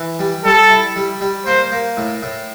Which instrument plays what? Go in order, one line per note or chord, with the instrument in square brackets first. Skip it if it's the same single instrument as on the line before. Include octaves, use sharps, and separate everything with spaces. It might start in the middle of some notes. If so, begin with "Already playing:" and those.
Already playing: [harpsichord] E3
G3
[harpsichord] G3 [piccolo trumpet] A4
[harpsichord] E4
G3
G3
[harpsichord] A#3 [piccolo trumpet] C5
[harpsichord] A#3
A2
A2